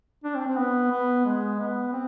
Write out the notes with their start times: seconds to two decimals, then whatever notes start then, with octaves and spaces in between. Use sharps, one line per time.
0.24 D4
0.35 C4
0.47 C4
0.57 B3
0.91 B3
1.25 G#3
1.59 B3
1.92 C4